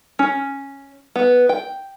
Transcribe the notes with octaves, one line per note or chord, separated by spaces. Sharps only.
C#4
B3
G5